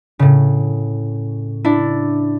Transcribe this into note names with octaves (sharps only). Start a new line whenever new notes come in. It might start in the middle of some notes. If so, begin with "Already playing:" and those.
A2 C#3
D4 E4